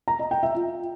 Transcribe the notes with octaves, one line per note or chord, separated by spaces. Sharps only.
A#5
D#5
G5
E5
F4